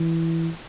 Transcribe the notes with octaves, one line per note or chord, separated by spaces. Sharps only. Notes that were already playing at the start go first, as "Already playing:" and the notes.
Already playing: E3